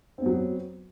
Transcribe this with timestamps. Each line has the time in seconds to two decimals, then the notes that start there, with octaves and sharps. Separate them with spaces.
0.18 C4
0.22 B3
0.26 F#3
0.30 F#4